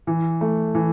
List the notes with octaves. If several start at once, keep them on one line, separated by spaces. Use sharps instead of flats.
E3
A3
E3